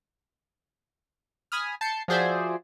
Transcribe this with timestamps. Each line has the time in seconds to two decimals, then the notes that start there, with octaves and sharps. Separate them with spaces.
1.52 G#5 B5 D#6 F6
1.81 A5 G6 C7 C#7
2.08 F3 F#4 G#4 C5 D5 E5